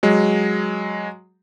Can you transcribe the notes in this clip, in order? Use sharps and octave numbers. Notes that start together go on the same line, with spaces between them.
F#3 G#3